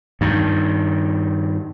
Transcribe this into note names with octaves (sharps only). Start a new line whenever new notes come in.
G2 D#3